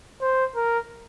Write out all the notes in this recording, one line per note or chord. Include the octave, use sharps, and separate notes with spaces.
C5
A#4